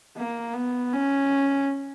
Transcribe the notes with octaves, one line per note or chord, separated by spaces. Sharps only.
A#3
B3
C#4